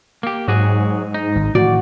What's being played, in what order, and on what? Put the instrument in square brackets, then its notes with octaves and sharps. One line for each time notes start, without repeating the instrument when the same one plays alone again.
[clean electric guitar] A#3 G4
[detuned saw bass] G#2 [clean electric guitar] F#3 F#4 G#4
[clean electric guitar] D#4
[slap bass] G#1
[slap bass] A2 D#3 E3 [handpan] F#4 [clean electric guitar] D5